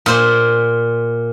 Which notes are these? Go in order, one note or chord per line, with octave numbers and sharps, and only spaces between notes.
A#2 C5